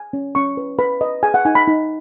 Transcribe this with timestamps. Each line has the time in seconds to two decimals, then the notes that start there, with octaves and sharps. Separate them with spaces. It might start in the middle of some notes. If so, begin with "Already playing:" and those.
Already playing: G#5
0.13 C#4
0.35 C#4 C#6
0.57 B4
0.79 B4 B5
1.01 B4 D#5
1.23 G#4 G#5
1.34 F#5
1.45 D#4 G#5
1.55 B5
1.67 D#4